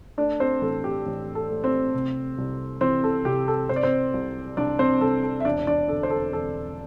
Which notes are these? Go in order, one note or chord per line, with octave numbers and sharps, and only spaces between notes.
A3 D4 D5
C4 C5
A1 A4
G4
A1
A4
A3
C4 C5
C3
C2
E3 C4 C5
A4
C3 G4
A4
C3 C5
D5
C4 C5
C2
C2 D4 D5
C4 C5
C2 A4
A4
E5
E1 D4 D5
D4 D5
D3 A4
C5
A4
E1 A4